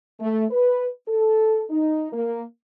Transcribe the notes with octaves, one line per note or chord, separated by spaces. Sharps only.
A3
B4
A4
D#4
A#3